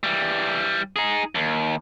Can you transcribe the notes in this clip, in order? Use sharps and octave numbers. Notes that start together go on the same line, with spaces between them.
E3 G3
D#4 G#4
D#2